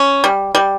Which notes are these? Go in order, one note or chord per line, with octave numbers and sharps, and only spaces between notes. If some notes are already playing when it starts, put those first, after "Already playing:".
Already playing: C#4
G3
G3